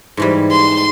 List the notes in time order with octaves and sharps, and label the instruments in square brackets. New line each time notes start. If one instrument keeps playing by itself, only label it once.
[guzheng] G#2 E3 G3
[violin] C6